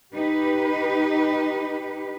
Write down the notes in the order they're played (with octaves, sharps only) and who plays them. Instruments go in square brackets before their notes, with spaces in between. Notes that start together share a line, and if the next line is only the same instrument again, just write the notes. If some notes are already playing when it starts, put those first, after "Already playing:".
[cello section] D#4 G4 B4